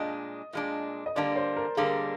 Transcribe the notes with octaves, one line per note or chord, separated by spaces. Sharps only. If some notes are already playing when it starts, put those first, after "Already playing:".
Already playing: A#2 G#3 D4 D#5
A#2 G#3 D4
D#5
D3 G3 A#3 D4 D5
C5
A#4
D3 G3 A#3 D4 G#4